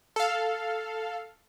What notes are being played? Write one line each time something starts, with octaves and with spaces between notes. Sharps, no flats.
A4 F5